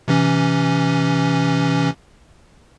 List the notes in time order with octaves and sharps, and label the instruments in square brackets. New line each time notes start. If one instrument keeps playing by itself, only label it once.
[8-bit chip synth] C3 E3 C#4